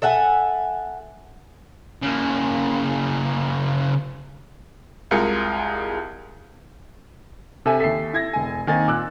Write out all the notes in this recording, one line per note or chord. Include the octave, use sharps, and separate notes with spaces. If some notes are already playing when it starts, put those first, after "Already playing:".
A4 E5 F#5 G#5
C#3 A#3
C2 G#3 F4 G#4 A#4 C#7
C3 A4 E5 G#5
D#2 A4 E5 B6 C7
E4 G#6 A#6
E1 G#5
D#3 A#3 C4 D#4 G#5 A6
A#2 D6 E6 F#6